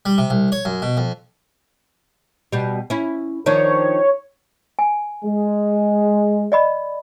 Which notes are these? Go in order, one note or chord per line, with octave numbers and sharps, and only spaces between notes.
G3
C3
C2
C#5
F#2
B2
F2
B2 G3
C#4 E4
D#3 F3 D4 C#5
G#5
G#3
D5 D#5 B5